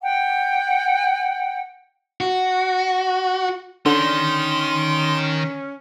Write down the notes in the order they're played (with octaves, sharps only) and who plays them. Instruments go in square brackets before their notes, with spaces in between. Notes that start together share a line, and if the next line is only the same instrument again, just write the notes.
[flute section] F#5 G5
[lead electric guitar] F#4
[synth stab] D3 [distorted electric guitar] D#3 [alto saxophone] C#4 [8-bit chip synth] C6